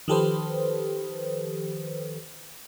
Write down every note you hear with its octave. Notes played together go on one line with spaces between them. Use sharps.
D#3 F3 G4 A4 B4 C5